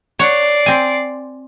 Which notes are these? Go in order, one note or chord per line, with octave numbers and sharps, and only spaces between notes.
C#5 D5 F#5 C7
C4 G#5